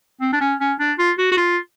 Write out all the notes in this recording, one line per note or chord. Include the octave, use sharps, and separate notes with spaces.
C4
D4
C#4
C#4
D4
F4
F#4
F#4
F4